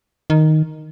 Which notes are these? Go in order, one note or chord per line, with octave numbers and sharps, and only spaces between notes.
D#3